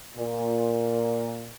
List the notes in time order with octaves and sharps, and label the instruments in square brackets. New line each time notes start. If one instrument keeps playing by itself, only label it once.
[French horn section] A#2